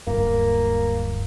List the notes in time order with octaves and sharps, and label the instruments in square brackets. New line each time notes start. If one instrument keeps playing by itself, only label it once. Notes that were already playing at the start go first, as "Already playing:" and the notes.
[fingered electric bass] D1 G2 [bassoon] A#3